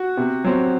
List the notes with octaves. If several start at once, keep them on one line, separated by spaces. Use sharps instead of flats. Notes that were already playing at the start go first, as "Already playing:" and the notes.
Already playing: F#4
C3
F#3 C4